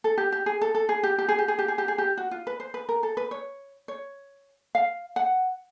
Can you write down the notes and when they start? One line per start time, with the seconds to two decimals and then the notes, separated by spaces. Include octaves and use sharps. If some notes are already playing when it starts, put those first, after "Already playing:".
0.04 A4
0.18 G4
0.32 G4
0.46 G#4
0.62 A4
0.75 A4
0.89 G#4
1.03 G4
1.18 G4
1.29 G#4
1.39 G4
1.48 G#4
1.59 G4
1.68 G#4
1.78 G4
1.88 G#4
1.98 G4
2.18 F#4
2.31 F4
2.47 B4
2.60 C5
2.74 B4
2.89 A#4
3.03 A4
3.17 B4
3.31 C#5
3.88 C#5
4.75 F5
5.16 F#5